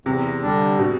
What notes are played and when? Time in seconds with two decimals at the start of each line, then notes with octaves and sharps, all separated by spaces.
0.06 E2 C3
0.42 D3 G3 D4
0.79 B2